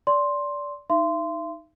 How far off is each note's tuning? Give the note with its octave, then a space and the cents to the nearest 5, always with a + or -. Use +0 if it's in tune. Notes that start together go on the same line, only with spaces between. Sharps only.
D5 -20 C6 +5
D#4 +0 E5 +45 C6 -15